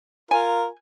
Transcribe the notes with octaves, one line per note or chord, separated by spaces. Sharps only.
F4 A#4 G#5